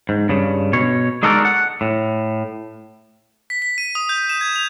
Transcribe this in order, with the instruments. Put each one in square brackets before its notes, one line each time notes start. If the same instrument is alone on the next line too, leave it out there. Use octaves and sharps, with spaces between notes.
[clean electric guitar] G#2
G2 C#3
B2 C#5
G#3 D#4 F#4 A4 A#4 D5
F#5
A2
[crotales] B6
B6
D#7
D#6
G6
E7
G#6
F7